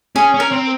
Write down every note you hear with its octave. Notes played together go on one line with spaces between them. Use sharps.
C#4 G#4
C#4
A#4
C4